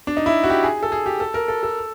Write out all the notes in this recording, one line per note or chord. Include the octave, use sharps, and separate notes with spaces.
D4
D#4
E4
F#4
G4
G#4
A4
G#4
G4
A4
A#4
A4
A4